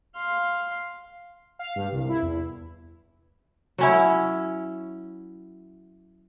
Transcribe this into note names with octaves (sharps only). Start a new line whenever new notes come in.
F5 C6
F5
G2
C2
E4
E2
F#3 C#4 E4